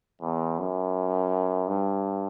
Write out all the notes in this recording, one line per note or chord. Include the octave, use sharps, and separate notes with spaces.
E2
F#2
G2